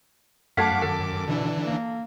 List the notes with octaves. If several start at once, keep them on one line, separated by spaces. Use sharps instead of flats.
F#2 A3 F5 F#5 A5 D6 G#6 B6
D#3 A4
B2 D3 E3 D4
A#3